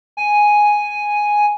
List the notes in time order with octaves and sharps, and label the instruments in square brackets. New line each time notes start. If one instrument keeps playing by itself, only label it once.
[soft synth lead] G#5